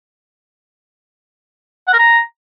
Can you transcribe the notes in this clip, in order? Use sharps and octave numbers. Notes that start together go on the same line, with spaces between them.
F#5
A#4
A#5